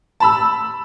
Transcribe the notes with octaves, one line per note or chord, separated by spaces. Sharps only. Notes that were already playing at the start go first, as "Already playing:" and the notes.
A5 B5 E6